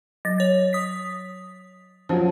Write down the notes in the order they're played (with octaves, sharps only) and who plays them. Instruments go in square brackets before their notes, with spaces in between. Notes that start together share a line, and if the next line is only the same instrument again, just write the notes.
[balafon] F#3 [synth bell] A6 A#6
[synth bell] C#5 A6
D#6 B6
[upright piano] F3 F#3 [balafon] C#4 F#4 C5